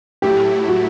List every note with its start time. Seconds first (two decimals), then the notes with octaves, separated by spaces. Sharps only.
0.22 A2 F#3 A3 E4 G4
0.68 F#4